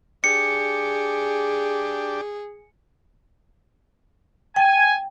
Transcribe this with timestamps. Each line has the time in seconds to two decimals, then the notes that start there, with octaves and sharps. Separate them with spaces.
0.24 D4 G4 G#4 C#7
4.56 G5 G#5